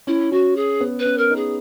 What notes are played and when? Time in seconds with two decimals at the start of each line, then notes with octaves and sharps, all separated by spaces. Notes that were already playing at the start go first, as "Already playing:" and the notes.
0.07 C#4 E4
0.32 C#4 F#4
0.56 G#4
0.80 B3
0.99 B4
1.05 C#4
1.18 A#4
1.30 D#4
1.36 G#4